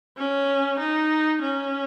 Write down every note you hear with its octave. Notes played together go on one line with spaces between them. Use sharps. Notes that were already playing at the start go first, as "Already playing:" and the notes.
C#4
D#4
C#4